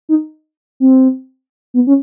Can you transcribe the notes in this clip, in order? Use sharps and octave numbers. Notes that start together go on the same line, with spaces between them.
D#4
C4
B3
C#4